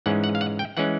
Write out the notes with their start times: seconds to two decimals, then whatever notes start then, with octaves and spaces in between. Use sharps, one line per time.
0.06 G#2 E3 G#3 C#4 F#5
0.24 F#5
0.35 F5
0.41 F#5
0.59 G5
0.77 E3 G#3 C#4 F#5